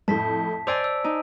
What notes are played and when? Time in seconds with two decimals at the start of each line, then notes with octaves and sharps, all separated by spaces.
0.08 F2 A2 A5 B6
0.67 C5 D5 G#5 D6 E6 D7 F7
0.84 E6
1.04 D#4